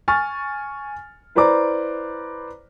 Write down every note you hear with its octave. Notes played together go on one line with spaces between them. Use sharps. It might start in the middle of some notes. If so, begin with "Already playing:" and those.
G#5 C#6 F6 A6
E4 B4 C5 D5 A#5 D6